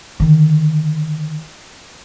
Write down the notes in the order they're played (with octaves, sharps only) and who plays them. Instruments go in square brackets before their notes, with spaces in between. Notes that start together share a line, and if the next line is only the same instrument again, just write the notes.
[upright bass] D3 D#3